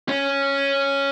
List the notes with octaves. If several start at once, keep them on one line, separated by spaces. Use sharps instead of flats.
C#4